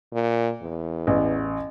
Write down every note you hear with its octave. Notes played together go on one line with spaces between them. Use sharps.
A#2
E2
A1